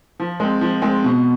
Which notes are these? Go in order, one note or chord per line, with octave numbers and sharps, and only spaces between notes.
F3
G#3 C4
F3
G#3 C4
B2